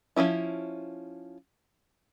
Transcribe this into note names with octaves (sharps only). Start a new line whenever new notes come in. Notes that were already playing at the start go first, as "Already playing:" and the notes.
F3 F#3 C#4 E4